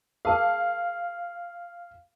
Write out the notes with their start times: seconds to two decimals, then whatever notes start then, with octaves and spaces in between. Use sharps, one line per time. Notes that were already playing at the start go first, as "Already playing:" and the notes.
0.25 G#4 A#4 F5 A5